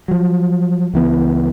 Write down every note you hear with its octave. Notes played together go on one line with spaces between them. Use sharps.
F3 F#3
C#2 E3 B3